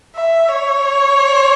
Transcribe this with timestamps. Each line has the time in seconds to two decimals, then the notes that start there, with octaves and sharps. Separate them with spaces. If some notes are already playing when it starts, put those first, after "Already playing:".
0.15 E5
0.49 C#5